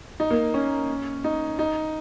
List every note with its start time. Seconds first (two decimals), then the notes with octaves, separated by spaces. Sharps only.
0.20 D#4
0.31 A#3
0.54 C#4
1.24 D#4
1.59 D#4